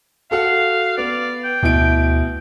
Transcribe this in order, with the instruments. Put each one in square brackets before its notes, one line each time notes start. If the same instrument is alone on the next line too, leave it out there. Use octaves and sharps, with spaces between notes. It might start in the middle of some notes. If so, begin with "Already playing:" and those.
[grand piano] F#4 A4 F#5 [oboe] F5
[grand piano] B3 [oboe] D5
[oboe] G5
[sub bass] D2 [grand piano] B2 E4 D7